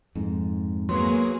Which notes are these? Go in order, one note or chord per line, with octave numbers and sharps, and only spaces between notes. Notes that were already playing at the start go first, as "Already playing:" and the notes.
F2 G#2
F#3 A#3 B3 G#4 C6